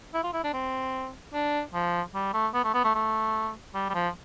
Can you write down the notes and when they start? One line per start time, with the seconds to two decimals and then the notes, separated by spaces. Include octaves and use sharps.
0.14 E4
0.24 F4
0.33 E4
0.44 D4
0.54 C4
1.34 D4
1.74 F3
2.15 G3
2.34 A3
2.54 B3
2.64 A3
2.74 B3
2.84 A3
2.95 A3
3.74 G3
3.90 G3
3.94 F3